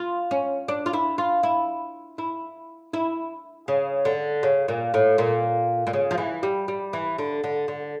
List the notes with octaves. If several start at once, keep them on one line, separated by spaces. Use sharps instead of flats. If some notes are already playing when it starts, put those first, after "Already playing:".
Already playing: F4
C#4
D4
F4
E4
F4
E4
E4
E4
C#3
D3
C#3
A#2
A2
A#2
A#2
C#3
F3
E3
G3
G3
E3
D3
D3
D3